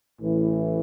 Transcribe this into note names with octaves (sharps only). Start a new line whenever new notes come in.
A1 A2 E3